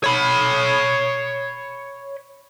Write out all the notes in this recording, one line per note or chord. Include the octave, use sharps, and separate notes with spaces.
C#5 B5